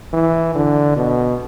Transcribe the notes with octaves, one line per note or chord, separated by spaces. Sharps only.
E3
D3
B2